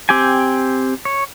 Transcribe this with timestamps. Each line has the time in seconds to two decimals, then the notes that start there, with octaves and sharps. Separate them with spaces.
0.09 C4 G4 G5 G#5
1.05 C#5